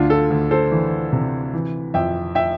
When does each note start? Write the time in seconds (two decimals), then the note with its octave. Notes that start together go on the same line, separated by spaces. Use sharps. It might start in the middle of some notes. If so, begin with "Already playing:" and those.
Already playing: D2 D4 F4
0.10 F4 A4
0.30 D2
0.51 A4 C5
0.72 E3
1.12 C3
1.54 E3
1.94 F2 E5 G5
2.35 E5 G5